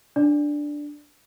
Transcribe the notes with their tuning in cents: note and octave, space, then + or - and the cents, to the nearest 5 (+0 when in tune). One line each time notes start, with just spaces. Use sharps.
D4 +0 D5 +0